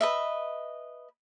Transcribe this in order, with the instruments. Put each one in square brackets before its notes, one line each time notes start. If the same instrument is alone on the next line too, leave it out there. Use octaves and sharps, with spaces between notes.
[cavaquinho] B4 D#5 E5